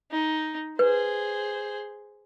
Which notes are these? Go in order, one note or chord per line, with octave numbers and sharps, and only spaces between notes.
D#4
G#4 B4 C5